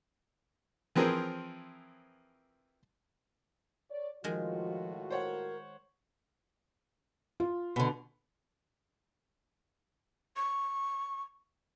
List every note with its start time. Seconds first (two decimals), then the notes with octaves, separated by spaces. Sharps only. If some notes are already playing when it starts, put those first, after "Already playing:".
0.96 E3 F3 C4 G#4 A#4
3.90 C#5 D5
4.24 A2 D#3 F3 G#3 F4 F#4
5.10 A#4 C5 C#5 F#5
7.40 F4
7.76 B2 D3
10.36 C#6